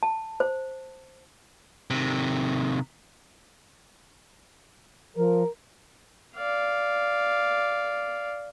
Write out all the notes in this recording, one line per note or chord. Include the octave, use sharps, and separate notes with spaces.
A5
C5
C3 D#3
F3 A#4
D5 F5